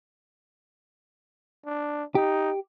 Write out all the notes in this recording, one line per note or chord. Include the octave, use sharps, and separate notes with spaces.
D4
D#4 G4